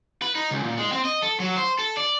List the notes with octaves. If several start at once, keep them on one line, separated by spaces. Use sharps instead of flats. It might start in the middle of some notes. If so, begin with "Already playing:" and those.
B4
D#4
C#2
A#2
G#3
C4
D#5
A4
F#3
C5
A4
D5